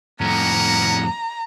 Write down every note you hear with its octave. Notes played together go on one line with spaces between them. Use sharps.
F2 A2 A#3 C#4 F#5 A#5